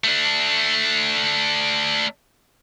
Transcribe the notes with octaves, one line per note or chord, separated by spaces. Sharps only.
A3 D4